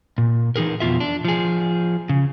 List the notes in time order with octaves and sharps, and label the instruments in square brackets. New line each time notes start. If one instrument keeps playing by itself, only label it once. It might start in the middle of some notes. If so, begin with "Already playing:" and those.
[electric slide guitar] A#2
E3 D#4 G#4 A#4
F2 B2 F4 E5
D4
F3 G#4
C#3